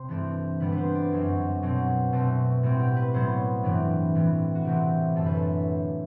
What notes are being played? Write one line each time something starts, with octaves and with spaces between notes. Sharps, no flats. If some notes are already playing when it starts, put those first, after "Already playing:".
Already playing: C3 C5
G2 E3 A3 C4 A4
G2 D3 G3 B3 B4
B4 C5
D5
F#2 F#3 C4
B2 F#3 C4
B2 A3 C4
A2 G3 C4 F#4
G4
B4
A2 F#3 B3 C5
G2 E3 G3 C4
A2 E3 G3
F#4
C3 E3 A3 C4 G4
F#2 D3 A3 A4
B4
A4